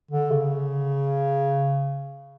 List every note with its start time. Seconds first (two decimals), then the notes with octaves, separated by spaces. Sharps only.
0.11 D3
0.31 C#3